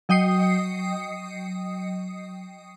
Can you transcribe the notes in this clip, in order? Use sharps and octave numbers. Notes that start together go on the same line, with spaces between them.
F#3 D#5 G5 D#6 C7 C#7